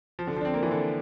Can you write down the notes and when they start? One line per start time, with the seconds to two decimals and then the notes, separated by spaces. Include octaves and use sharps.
0.19 F3
0.27 D3
0.36 F3
0.41 D4
0.45 C4
0.54 A#3
0.63 E3
0.71 D3